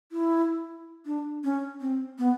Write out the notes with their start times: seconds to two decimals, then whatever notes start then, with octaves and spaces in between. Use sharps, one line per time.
0.12 E4
1.06 D4
1.44 C#4
1.81 C4
2.19 B3